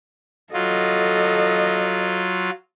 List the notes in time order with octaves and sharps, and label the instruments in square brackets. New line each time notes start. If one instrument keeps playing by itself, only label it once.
[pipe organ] F#3 F4 [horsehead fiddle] A4 D#5